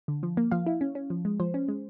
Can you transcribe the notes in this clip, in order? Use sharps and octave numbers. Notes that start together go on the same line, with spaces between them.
D3
F3
A#3
F3 F5
E4
C#4
C#4
F3
G#3
F3 C5
C#4
G#3